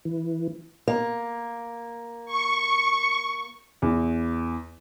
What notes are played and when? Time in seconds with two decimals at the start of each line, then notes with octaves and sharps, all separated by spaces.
0.05 E3
0.88 A#3
2.26 C#6
3.82 E2